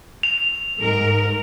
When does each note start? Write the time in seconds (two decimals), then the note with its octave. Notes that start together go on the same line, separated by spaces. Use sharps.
0.23 F7
0.77 G#2 A#4